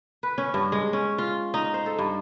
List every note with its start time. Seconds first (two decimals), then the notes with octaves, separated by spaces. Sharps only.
0.23 B4
0.38 C#4
0.54 G2
0.72 G#3
0.93 C#4
1.18 F4
1.54 D#4
1.74 C5
1.86 A4
1.99 G2